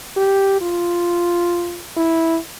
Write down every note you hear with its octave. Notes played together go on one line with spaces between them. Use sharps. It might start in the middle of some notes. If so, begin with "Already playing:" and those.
G4
F4
E4